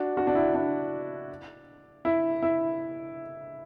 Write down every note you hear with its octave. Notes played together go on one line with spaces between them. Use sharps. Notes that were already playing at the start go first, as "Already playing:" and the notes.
Already playing: D4 F#4
D4 F#4
D4
E4
D4
E4
E4